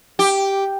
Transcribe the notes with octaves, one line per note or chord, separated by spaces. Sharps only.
G4